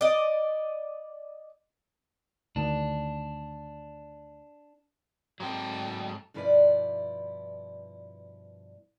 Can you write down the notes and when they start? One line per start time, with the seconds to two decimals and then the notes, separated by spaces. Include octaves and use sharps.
0.01 D5 D#5
2.56 D2 D#3 D4
5.40 G#2 F#3 C4 A4 G5
6.34 G2 B2 F3 E4 B4 D5